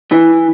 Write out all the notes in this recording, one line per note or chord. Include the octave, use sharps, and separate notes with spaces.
E3